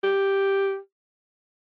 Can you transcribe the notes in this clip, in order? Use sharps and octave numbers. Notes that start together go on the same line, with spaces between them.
G4